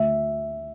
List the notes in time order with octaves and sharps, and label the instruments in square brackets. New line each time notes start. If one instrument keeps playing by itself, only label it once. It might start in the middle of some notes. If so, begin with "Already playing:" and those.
Already playing: [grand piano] D2 E5